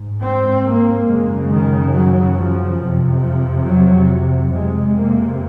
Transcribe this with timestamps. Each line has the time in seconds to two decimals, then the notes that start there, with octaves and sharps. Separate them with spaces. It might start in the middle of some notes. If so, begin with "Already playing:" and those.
Already playing: G#2
0.21 C4
0.64 A#3
1.07 F#2 C#3 G#3
1.51 D#3
1.93 F#3
2.37 F3
2.79 F2 C3
3.22 F3
3.66 F#3
4.52 F2 C3 G#3
4.95 A#3